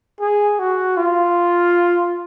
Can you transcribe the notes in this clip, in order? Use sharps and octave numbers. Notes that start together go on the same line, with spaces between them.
G#4
F#4
F4